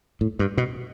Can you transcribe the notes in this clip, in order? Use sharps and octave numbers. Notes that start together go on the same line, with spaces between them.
A2
G2
B2